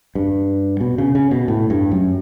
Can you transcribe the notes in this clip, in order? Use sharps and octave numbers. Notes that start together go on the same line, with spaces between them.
G2
B2
C#3
C#3
B2
A2
G2
F#2